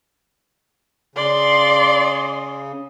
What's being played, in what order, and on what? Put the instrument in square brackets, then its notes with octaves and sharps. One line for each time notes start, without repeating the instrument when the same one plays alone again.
[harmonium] C#3 [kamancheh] D5 C6